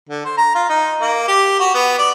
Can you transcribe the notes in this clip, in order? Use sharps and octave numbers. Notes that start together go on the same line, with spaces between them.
D3
C5
A#5
F4
D#4
A#3
G4
F#4
B3
D5